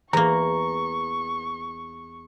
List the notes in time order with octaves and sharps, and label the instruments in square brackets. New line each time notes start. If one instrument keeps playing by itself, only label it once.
[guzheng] E2 A#3 [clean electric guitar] A#5 [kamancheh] C#6